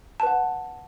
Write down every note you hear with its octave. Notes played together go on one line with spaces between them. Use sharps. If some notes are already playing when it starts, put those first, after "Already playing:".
B4 F#5 A5